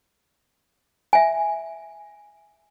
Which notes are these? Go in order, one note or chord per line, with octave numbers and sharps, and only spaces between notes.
E5 G#5